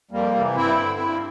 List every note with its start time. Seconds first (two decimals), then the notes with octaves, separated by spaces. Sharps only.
0.11 F2 G3 A#3
0.34 C3 E3
0.55 G2 C4 E4
0.78 D3
1.00 G2